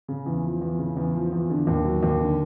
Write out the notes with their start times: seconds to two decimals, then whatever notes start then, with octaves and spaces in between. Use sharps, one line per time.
0.08 C#3
0.26 E2
0.43 F3
0.61 E2
0.79 C#3
0.97 E2
1.14 F3
1.32 E2
1.50 D3
1.67 D#2
1.85 F#3
2.03 D#2
2.20 D3